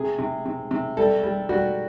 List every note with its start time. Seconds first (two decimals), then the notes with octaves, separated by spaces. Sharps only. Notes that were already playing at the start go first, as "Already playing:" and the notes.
Already playing: C3 G#4
0.19 C3
0.46 C3
0.71 C3
0.97 G3 A4
1.23 G3
1.49 G3 F#4